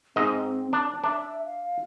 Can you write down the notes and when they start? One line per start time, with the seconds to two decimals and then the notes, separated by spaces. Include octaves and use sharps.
0.16 G#2 C4 D#5
0.73 D4 A5
1.04 D4 E5
1.45 F5